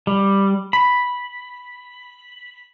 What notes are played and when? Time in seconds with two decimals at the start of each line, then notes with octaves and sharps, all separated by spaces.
0.07 G3
0.73 B5